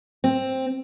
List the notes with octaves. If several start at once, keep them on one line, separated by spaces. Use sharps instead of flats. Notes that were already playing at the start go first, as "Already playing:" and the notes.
C4